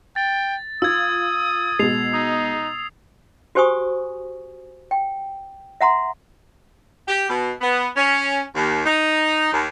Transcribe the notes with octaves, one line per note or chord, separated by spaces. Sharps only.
G5 A6
F4 D#6 E6 G#6
B2 G#3 C7 F7
D#4 D#6
F#4 G4 C5 G#5 C#6 D#6
G5
E5 F#5 A#5 C6
G4
B2
B3
C#4
D#2
D#4
D#2